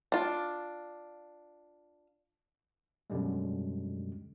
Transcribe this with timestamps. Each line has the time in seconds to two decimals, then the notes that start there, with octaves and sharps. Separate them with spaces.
0.12 D4 F4
3.10 F#2 B2 D3 G3 G#3